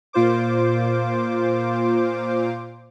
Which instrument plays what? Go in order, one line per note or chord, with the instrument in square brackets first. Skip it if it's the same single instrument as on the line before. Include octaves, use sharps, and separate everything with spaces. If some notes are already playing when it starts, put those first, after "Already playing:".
[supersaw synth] A#2 F4 C5 D6